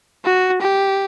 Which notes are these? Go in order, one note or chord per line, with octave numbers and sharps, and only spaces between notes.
F#4
G4